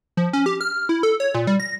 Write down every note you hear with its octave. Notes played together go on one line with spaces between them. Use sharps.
F3
C#4
G4
F6
E4
A4
C#5
A#2
G3
A#6